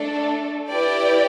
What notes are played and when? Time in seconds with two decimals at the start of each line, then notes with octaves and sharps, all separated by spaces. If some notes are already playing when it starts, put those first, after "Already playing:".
Already playing: A3 D4 A4
0.68 E4 G4 B4 D5 G5